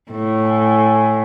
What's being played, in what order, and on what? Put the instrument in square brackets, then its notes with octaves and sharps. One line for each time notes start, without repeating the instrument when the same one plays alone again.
[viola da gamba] A2
[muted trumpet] G#5